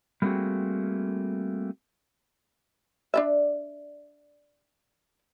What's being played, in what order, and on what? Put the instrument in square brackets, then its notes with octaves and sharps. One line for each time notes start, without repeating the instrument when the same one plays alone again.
[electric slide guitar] G3 A3 A#3 C4 F#4 G#4
[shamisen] D4 D5 E5